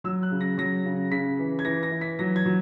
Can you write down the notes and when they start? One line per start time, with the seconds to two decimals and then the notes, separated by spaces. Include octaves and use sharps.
0.04 F#3 E6
0.23 F#6
0.31 C#3
0.41 A#6
0.58 F#3 A#6
0.85 C#3
1.11 C#3 B6
1.39 E3
1.59 G#6
1.65 E3 A#6
1.83 A#6
1.91 E3
2.01 B6
2.19 F#3 A#6
2.36 G#6
2.46 F#3